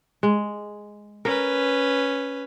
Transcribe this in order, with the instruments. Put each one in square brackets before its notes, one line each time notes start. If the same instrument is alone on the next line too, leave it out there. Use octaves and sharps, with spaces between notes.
[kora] G#3
[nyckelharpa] C#4 B4 [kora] A#4